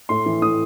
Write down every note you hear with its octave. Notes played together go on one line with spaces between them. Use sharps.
A2 C6
E3
A2 D#6